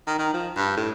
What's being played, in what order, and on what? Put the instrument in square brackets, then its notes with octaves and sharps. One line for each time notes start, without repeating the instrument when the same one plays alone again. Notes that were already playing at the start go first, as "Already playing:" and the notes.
[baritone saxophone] D#3
D#3
F3
G2
A2